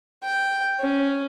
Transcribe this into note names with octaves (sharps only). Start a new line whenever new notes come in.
G5
C#4